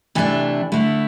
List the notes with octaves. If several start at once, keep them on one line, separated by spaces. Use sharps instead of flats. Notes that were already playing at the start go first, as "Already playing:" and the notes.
C3 E3 A3 D4 A4
D3 A3 E4